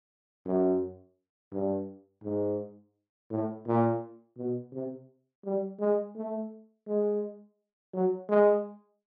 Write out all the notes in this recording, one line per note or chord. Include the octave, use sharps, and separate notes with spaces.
F#2
G2
G#2
A2
A#2
B2
C3
G3
G#3
A3
G#3
F#3
G#3